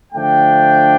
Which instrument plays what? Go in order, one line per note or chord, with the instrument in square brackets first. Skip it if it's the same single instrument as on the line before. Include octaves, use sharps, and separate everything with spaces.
[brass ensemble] D3 F3 A3 D4 G5